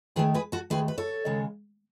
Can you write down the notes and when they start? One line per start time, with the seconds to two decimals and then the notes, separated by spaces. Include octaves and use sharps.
0.16 D#2 D#3 A3 G#4 B4
0.34 G#4 B4
0.52 F#4 A4
0.70 D#2 D#3 A3 G#4 B4
0.88 B4
0.98 A4 C#5
1.25 D#2 C#3 G#3